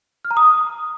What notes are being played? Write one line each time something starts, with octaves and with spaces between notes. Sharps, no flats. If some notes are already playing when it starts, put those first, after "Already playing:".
F6
A#5
D#6